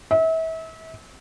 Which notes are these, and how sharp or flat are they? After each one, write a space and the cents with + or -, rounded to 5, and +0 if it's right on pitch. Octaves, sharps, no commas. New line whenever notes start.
E5 -35